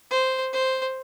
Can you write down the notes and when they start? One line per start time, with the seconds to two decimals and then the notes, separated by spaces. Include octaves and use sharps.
0.10 C5
0.53 C5